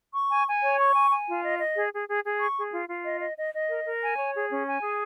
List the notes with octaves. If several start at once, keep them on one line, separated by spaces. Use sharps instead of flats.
C#6
G#5
G#5
C#5
C#6
G#5
G#5
F4
D#5
D#5
G#4
G#4
G#4
G#4
C#6
G#4
F4
F4
D#5
D#5
D#5
D#5
A#4
A#4
G#5
C#5
G#4
C#4
G#5
G#4